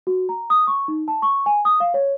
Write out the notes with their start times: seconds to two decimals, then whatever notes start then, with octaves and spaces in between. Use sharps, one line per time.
0.07 F#4
0.29 A#5
0.50 D#6
0.67 C#6
0.88 D#4
1.08 A5
1.22 C#6
1.46 G#5
1.65 D#6
1.80 F5
1.94 C#5